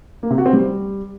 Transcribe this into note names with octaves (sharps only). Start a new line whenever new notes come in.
A#3
C3
F#4
C4
G3